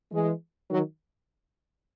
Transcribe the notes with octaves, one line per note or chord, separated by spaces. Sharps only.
E3 G#3
D#3 F#3